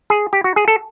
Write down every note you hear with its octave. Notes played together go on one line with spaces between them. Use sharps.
G#4
G4
F#4
G#4
A4